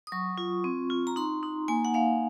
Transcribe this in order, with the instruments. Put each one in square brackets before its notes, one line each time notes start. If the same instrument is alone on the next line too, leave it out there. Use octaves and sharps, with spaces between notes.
[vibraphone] D#6
F#3 C#6
F4
C4
F4
A#5
D#4 C6
D#4
A#3 G#5
F#5
A#3 F5